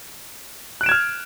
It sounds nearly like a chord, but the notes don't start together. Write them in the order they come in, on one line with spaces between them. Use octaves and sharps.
F#6 D7 E7 G#6 F6